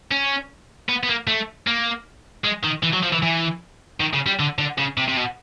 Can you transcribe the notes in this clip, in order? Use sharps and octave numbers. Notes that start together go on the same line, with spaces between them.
C#4
B3
B3
A#3
A3
A#3
G#3
D#3
E3
F#3
F3
E3
E3
D#3
C#3
G3
D3
D3
C#3
C3
C3
B2